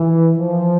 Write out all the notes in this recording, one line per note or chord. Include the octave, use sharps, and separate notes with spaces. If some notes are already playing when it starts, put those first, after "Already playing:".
Already playing: E3
F3